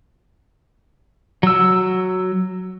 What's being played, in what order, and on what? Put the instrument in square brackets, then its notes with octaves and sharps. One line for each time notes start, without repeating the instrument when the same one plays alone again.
[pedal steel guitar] F#3 E6